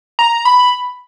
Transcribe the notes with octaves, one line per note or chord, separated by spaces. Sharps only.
A#5
B5